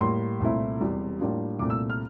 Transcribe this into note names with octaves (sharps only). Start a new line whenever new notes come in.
A2 G3 A#3 C6
C2 A#2 A3 C4 E4
E1 E2 C3 G3
A2 G3 A#3 D4 F4
C2 A#2 A3 C4 D6
E6
F6